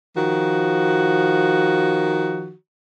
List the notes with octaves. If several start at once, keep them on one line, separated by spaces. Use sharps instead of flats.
D#3 F3 F#4